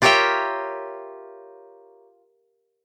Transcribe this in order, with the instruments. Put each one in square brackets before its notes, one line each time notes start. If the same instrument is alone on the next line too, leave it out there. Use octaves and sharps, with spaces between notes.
[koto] F4 G4 A#4 C#5 E5 G5